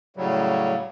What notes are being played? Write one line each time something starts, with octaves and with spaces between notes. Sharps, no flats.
A2 C#3 F#3 G3